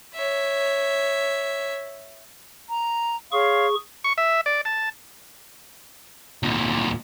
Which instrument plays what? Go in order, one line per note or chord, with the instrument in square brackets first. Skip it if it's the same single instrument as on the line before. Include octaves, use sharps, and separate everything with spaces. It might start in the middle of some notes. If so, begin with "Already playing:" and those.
[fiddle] C#5 E5
[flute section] A#5
[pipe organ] G#4 C#6 [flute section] C#5 F5 C6
[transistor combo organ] C#6
E5
D5
A5
[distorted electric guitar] D2 A#2